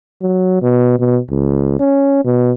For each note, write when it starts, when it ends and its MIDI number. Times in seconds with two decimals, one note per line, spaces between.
0.22 0.62 54
0.62 0.98 47
0.99 1.19 47
1.30 1.77 37
1.80 2.20 61
2.25 2.52 47